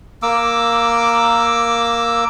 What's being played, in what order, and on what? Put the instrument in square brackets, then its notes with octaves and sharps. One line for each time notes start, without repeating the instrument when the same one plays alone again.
[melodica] A#3 D6 E6